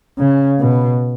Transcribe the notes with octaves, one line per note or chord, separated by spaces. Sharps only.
C#3
B2